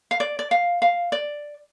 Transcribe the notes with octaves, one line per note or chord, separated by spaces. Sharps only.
F5
D5
D5
F5
F5
D5